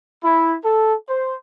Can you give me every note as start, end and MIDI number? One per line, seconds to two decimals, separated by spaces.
0.22 0.54 64
0.62 0.93 69
1.07 1.33 72